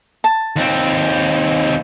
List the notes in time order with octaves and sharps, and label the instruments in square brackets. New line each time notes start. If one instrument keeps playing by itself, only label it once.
[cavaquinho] A5
[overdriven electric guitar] D#2 C4